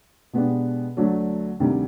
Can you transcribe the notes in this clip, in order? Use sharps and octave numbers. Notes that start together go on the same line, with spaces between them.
B2 G#3 B3 D4 G4
D2 D3 F#3 A3 D4
D2 C3 D#3 G3